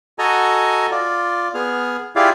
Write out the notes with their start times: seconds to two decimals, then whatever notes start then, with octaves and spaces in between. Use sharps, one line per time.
0.19 F#4 A4 D#5 G#5 A#5
0.91 F4 D5
1.54 B3 G#4 F6
2.16 E4 F4 G4 G#4 D5 F5